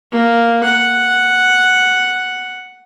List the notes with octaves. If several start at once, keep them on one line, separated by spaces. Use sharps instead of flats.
A#3
F#5